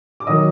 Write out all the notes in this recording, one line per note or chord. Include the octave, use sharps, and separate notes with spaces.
D6
D#3 F#3 D#5 D#6